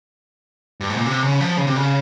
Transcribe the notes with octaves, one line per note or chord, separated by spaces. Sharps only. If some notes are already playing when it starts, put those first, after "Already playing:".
G2
G#2
A#2
C3
C#3
F3
C#3
C3
C#3